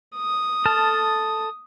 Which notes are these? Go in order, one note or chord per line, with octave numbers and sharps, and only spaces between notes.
D#6
A4 A5 F6